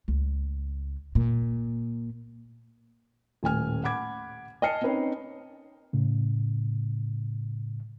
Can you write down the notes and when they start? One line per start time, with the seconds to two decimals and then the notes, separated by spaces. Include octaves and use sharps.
0.08 C#2
1.15 A#2
3.43 D#1 A2 G#5 F6
3.84 F#5 B5 D6 G#6
4.62 D#5 G#5 A5 F6 C7 C#7
4.81 C4 C#4 D#4 B4 C#5
5.93 A2 C#3